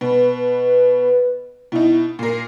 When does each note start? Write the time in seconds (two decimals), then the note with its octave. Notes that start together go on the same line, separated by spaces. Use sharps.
0.01 B2 B4
1.72 B2 D#4 E4
2.19 A#2 A#4 C7